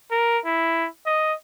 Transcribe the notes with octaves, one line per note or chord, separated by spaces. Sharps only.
A#4
E4
D#5